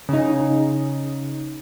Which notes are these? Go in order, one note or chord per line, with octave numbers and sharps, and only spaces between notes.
C#3 D#4